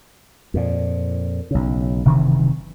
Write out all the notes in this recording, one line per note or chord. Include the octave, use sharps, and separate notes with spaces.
F2 A#2
B1 C#3
F#1 C3 D#3 E3